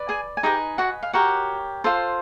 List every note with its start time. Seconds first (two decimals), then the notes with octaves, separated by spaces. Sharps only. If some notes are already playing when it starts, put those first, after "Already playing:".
Already playing: B4 D5
0.09 G#4 G#5
0.37 G#5
0.43 D#4 G4 G#4 B4 D#5 G5
0.78 F#4 F#5
1.03 F5
1.13 F#4 G4 A#4 C#5 F#5
1.84 F4 A4 C5